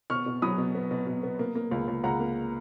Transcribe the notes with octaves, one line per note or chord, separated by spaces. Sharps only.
B2 C#6 F6
B2
F#3 B5 D#6
B2
B3
B2
B2
B3
A#3
A#3
C#2
C#2
C#2 F#5 A#5
A#3